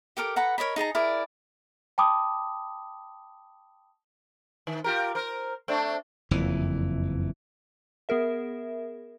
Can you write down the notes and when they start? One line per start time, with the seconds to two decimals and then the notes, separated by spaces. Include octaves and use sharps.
0.17 G4 A4 A#4 D6
0.36 A4 B4 F#5 A#5
0.58 A#4 C#5 D#5 B5
0.76 D#4 G#4 A5 A#5
0.95 E4 G#4 A#4 D5
1.98 G5 A5 B5 D6 D#6
4.67 D#3
4.84 F4 G4 A#4
5.15 A#4 C5
5.68 A3 C4 D4
6.31 F#1 F2 E3
8.09 B3 G#4 A#4 E5